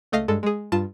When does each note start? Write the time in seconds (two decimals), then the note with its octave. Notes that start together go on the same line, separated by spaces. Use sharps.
0.12 C#2 A3 D#5 F5 A#6 C7
0.28 G2 G#3 A4
0.43 G#3 G#4
0.72 G2 F4 A5 E7